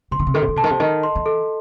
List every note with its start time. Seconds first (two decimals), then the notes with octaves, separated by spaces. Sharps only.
0.11 C3 C6
0.19 D#3
0.27 C3
0.34 D#3 A4
0.42 C3
0.48 D#3
0.56 C3 A5
0.64 D#3
0.70 C3
0.80 D#3 D#5
1.03 C6
1.15 E3
1.26 A4